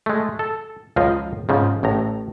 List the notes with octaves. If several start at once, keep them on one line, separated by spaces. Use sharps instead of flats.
G#3 A3
A4
C#2 F#2 F3 D#5 F5
G#2 C#3 F3
A1 A2 A#5